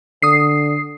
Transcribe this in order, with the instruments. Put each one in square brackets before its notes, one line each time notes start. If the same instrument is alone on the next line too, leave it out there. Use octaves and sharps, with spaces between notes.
[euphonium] D3 [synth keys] D#6 C7